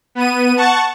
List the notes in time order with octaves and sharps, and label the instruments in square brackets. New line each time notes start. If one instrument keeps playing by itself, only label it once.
[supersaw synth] B3 D#7
F#5 A5 C#6